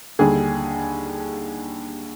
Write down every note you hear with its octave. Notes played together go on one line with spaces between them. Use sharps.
D#2 D3 G3 G#4